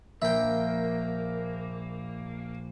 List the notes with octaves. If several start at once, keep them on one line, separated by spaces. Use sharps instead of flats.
A#1 A#3 A#4 E5 G5